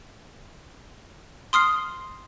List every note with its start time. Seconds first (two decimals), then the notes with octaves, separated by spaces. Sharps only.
1.53 C6 D#6 F6 C7